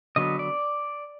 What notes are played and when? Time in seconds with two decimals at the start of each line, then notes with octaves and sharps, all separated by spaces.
0.16 D3 F#3 B3 D#5
0.39 D5